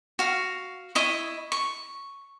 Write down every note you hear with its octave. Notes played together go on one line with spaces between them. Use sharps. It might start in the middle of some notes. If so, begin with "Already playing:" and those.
F#4 F5
E4 D#5 C#6
C#6